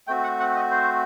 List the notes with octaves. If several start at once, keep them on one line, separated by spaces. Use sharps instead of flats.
A3 C4 F#4 G5
F#5
F#5
D#5
C5